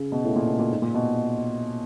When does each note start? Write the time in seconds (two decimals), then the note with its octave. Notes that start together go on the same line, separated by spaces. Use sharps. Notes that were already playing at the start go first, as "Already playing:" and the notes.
Already playing: C#3
0.12 B2
0.24 A2
0.36 A#2
0.47 B2
0.59 A#2
0.70 G#2
0.82 A#2
0.94 B2